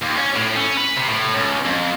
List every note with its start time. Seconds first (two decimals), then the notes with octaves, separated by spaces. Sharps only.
0.02 D#2
0.16 C#4
0.36 A2
0.57 C#4
0.77 B4
0.97 C3
1.09 A2
1.33 C#2
1.66 F2